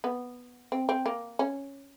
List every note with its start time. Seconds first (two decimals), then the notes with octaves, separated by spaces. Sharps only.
0.04 B3
0.72 C4
0.89 C4
1.06 A#3
1.39 C#4